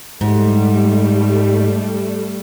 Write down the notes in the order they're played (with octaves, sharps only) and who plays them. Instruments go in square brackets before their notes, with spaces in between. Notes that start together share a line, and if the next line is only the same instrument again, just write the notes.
[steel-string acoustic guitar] G#2 [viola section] G3 A3